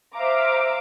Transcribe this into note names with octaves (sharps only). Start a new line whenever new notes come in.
C5 E5 F5 A#5 D6